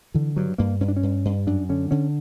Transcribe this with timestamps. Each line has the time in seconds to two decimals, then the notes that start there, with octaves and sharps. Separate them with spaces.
0.14 D3 E3
0.36 G2 F#3
0.58 G2 A#3
0.81 G2 C#4
0.88 D4
0.97 C#4
1.03 G2
1.25 G2
1.47 F#2 D4
1.69 D3 C#4
1.91 D3 C#4